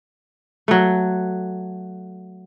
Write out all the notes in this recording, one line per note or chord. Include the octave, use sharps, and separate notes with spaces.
F#3 A3